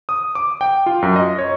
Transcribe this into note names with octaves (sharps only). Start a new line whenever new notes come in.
D#6
D6
G5
F4
F#2
D#5
C#5